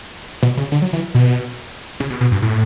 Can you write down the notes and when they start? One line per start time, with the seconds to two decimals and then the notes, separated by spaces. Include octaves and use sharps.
0.43 B2
0.57 C#3
0.72 D3
0.82 F#3
0.93 E3
1.15 B2
2.00 C#3
2.10 B2
2.21 B2
2.32 G2
2.42 A2